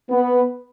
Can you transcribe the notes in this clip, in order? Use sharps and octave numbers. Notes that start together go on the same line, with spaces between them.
B3